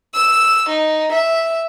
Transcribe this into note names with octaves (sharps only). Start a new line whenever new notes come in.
E6
D#4
E5